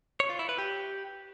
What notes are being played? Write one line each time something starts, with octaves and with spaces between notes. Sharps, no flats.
C#5
F4
E4
B4
G4